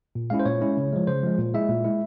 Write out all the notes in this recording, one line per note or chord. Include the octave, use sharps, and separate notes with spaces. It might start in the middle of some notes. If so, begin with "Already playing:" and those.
A#2
G#3 C#4 E4 F5
C5
A#2 C#5
G#3 C#4 E4
C#3
F3 G#3
C#3 C5
F3 G#3
A#2
G#3 E4 E5
A#2
G#3 E4